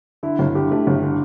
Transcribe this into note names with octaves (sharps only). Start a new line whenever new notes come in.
D3 E4
G1
D3 G4
A3
G1
D3